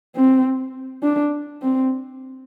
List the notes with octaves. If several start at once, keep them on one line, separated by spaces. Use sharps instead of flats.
C4
D4
C4